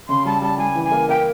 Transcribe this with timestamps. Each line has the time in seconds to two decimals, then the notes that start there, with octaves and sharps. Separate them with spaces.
0.09 C#3 C6
0.25 G3 A5
0.42 G3 A5
0.58 G3 G#5
0.75 E3
0.84 G#5
0.92 A#3
1.09 A#3 G5